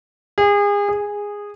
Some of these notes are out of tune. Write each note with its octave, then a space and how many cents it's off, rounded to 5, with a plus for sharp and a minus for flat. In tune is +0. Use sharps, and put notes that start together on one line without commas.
G#4 -35
G#4 -15